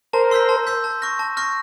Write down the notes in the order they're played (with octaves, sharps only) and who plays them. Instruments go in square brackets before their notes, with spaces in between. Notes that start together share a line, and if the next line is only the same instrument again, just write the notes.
[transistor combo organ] A#4 C5 [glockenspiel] A5
[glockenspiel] C6 E6 G6 B6
A5
C6 E6 G6 B6
A5
C#6 F6 A#6
A5
C#6 F6 A#6